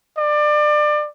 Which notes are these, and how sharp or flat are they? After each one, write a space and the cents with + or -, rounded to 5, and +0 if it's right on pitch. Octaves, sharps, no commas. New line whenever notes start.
D5 +25